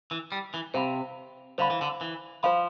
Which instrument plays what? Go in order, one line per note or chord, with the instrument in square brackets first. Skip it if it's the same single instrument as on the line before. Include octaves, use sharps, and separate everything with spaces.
[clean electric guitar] E3
G3
E3
[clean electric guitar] C3 [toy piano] C5 F5 B5
[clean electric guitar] D3 [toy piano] C5 F5 B5
[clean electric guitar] E3
D3
E3
[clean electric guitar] F3 [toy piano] C5 F5 B5